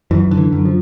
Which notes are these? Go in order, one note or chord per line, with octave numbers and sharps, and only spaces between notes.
F#2 E3
D3
E3
F#2
F3